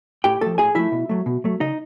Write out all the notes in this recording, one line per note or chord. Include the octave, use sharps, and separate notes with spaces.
A2 G4 G5
F3 A3 A4 A5
A2 G#4 G#5
F3 A3 E4 E5
B2
F#3 A3
B2
F#3 A3
C#3 D#4 D#5